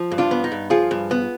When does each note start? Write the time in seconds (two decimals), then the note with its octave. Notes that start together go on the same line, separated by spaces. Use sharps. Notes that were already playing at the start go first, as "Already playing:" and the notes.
Already playing: F3
0.11 G2
0.18 D4 F4
0.31 B3
0.44 D#4
0.52 G2
0.70 F3 F4 G#4
0.91 G2
1.11 B3